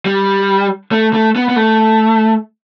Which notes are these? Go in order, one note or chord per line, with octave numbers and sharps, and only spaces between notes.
G3
A3
A3
B3
B3
A3